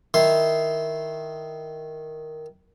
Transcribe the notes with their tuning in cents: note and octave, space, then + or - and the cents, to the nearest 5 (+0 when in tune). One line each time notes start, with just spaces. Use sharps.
D#3 +0 E4 -10 C6 +0